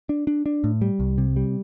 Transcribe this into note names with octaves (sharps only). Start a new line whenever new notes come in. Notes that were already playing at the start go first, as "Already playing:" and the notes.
D4
D4
D4
A2
G3
C2
C3
G3